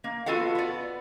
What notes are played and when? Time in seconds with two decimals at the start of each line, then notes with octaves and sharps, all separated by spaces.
0.04 A#3
0.26 B3 F4 F#4 A4 F5 F#5
0.55 B3 D5